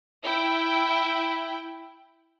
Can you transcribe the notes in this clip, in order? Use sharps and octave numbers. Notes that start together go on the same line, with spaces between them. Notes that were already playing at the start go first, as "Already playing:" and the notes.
E4 G5